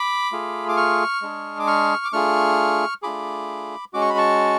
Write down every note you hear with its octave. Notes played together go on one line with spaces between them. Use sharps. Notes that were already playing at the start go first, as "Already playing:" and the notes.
Already playing: B5 D6
A3 F4 G#4
D6
C#6 F6
G#3 D4 G#4
D6
C#6 F6
D6
A3 D4 F4 G#4 C#6 F6
A3 D4 F4 G#4 B5 D6
G#3 C#4 F#4 D6
C#6
B5
A5 C#6